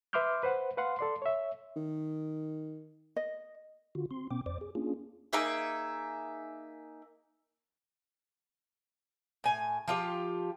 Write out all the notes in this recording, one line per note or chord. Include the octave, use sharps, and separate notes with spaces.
B4 E5 C6 D6 F6 G6
B4 C5 F#5
B4 F5 F#5 C6
A4 D5 C6
C#5 E5
D#3
D#5
D3 F4 F#4
C4 C6
B2 B3 C#4 G5 D6
F2 C5 D5 D6
G#4
A#3 C#4 D4 F4 G#4
A#3 D#4 G#4 E5
A2 G#5
F3 F4 G4